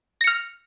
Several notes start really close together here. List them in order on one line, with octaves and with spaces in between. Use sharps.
A#6 C#7 F6